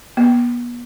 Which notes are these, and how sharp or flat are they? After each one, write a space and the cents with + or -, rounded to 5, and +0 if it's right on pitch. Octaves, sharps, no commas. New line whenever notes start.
B3 -35